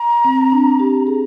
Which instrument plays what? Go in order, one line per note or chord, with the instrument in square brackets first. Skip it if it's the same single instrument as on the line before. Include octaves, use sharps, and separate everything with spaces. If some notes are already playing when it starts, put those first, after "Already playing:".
Already playing: [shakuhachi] A#5
[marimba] C4
D4
G4
G#4